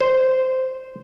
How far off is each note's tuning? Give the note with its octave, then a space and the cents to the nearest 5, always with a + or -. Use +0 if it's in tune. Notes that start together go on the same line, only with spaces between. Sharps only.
C5 -10